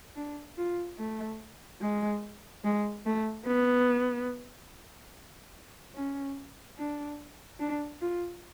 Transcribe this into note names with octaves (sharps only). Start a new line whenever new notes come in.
D4
F4
A3
G#3
G#3
A3
B3
C#4
D4
D4
F4